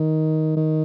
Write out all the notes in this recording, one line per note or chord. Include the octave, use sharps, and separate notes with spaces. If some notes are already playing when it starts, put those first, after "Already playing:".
Already playing: D#3
D#3